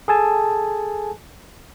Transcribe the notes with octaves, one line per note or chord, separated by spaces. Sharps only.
G#4 A4 G#5 A5